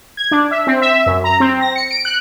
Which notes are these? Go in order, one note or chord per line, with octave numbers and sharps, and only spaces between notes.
G#6
D4
E5
C4
E5
F#2
A#5
C4
A#6
C#7
D7
F#6